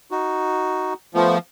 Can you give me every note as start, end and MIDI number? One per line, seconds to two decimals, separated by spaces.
0.11 0.94 63
0.11 0.94 66
1.14 1.38 53
1.14 1.37 57
1.14 1.37 59